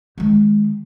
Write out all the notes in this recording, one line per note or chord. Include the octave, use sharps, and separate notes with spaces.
D#3 G#3